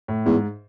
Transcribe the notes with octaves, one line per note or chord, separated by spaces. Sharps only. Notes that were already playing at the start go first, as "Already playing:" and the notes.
A2
E2 G#2